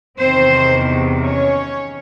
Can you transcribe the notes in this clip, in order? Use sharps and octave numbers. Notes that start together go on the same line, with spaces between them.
E2 C3 D#3 C4 C5
C#4 C#5